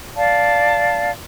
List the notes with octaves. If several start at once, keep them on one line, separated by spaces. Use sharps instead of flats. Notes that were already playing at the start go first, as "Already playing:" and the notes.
D5 F5 A5